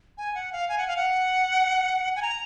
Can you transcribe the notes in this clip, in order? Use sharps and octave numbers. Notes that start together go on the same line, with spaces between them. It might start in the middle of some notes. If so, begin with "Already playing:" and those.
G#5
F#5
F5
G#5
F#5
F5
F#5
G#5
A#5